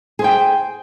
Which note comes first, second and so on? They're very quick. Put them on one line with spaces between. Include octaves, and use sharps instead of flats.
G#4 C5 G5